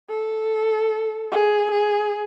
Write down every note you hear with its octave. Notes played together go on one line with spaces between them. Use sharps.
A4
G#4
G#4